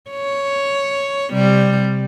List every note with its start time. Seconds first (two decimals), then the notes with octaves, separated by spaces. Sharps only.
0.11 C#5
1.32 C3 G3